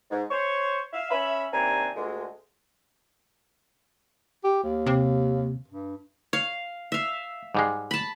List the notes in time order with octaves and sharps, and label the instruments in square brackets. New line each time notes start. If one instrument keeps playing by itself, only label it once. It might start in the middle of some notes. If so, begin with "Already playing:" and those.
[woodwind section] G#2
C5 C#5 C#6
E5 F5
C#4 E5 B5
D#2 C3 C4 D4 G#5 A#5
D2 A#2 G#3
[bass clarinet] G4
D#2
[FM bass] C3
[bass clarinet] G2
[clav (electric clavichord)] C#5 [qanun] F5
[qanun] E5 F5
[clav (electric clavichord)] G#2 G3 G#3
[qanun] A5 B5